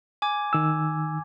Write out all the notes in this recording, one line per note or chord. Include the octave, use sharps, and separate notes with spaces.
G#5 D6 G#6
D#3 E6